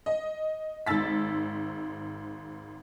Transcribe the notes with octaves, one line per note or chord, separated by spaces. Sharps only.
D#5
G#1 G#2 E6 A6 B6